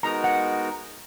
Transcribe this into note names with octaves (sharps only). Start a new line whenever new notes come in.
G#3 B3 D#4 F#4 A#4 A#5
F#5